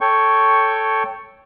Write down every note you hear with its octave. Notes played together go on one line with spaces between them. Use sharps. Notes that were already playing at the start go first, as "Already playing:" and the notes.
A4 C#5 G5 C#6